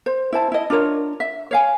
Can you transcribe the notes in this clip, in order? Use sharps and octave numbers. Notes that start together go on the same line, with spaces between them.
C5
E4 C5 A5
E4 D#5
D4 F4 A#4 C#5
E5
C#5 F5 G#5